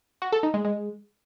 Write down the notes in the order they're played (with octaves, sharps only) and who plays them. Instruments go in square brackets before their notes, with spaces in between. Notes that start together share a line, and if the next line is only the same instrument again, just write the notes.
[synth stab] F#4
A4
D#4
G#3
G#3